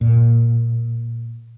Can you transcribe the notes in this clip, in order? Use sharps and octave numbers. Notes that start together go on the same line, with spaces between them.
A#2